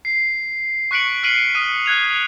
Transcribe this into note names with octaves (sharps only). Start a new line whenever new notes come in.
C7
C#6 F#6 B6 C#7 D7 F#7
F6 B6 C7 D7 D#7 F#7
D#6 F6 D#7
D#6 F#6 G#6 F7